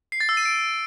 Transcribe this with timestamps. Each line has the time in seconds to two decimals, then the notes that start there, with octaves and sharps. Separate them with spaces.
0.12 C7
0.20 A6
0.29 E6
0.37 D#7
0.45 D7